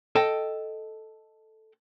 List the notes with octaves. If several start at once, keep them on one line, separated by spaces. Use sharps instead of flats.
A4 D#5 G5